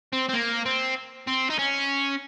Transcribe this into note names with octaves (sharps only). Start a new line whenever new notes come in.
C4
C4
A#3
C4
C4
D#4
C#4